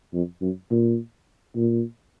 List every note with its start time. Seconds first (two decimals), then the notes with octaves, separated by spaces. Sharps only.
0.14 F2
0.42 F#2
0.71 A#2
1.56 A#2